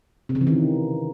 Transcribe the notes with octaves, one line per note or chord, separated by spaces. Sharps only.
C3
C#3
E3
D#3